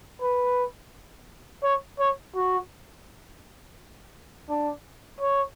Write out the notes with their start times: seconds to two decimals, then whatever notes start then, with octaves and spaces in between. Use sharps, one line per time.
0.22 B4
1.63 C#5
1.99 C#5
2.36 F#4
4.49 D4
5.20 C#5